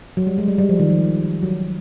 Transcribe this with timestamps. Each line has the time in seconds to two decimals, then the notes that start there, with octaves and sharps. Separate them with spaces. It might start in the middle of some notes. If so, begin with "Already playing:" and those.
0.17 F#3
0.27 G3
0.38 G#3
0.48 G3
0.58 G3
0.69 F3
0.80 D#3
0.90 F3
1.43 F#3